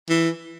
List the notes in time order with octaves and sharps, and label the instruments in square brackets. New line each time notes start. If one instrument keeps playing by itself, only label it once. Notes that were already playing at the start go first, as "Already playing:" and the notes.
[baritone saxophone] E3